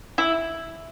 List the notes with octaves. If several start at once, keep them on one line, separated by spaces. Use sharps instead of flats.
E4